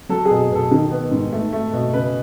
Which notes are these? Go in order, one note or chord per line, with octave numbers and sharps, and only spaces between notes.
F#3 A4
B2 G#4
B2 A4
D#3
B3
G#2
A3
A3
B2
C#3 B4